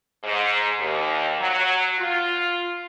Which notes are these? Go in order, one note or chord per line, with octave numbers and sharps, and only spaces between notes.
G#2
D#2
F#3
F4